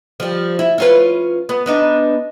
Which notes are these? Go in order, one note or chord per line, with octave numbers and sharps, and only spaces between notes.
F3 G3
E4
C#4 F4 B4
B3
B3 D4 D#4